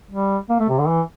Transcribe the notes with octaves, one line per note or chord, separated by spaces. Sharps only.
G3
A#3
A3
C3
D3
E3